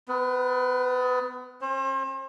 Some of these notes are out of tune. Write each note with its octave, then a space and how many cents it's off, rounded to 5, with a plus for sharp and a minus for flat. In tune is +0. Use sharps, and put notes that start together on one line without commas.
B3 +35 B4 -25
C#4 -45 C5 +35